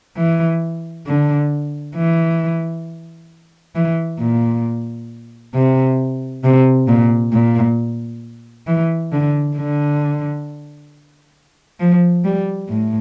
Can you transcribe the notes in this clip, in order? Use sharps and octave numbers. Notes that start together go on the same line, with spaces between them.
E3
D3
E3
E3
A#2
C3
C3
A#2
A#2
E3
D3
D3
F3
G3
A2